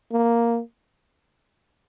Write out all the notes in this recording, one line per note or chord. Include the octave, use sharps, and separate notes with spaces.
A#3